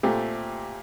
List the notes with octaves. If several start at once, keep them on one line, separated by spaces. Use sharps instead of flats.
A#2 A3 C4 G4